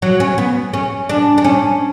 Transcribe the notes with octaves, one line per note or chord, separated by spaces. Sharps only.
F#3
C#4
B3
C#4
D4
D4
C#4